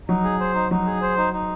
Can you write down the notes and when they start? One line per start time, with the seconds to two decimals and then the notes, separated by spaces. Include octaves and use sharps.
0.08 F#3 D#4
0.24 G#4
0.40 C5
0.55 D#4
0.71 F#3 D#4
0.86 G#4
1.02 C5
1.17 D#4
1.33 D#4